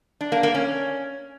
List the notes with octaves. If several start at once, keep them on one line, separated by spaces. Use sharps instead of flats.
D4
A#3
A#3
C#4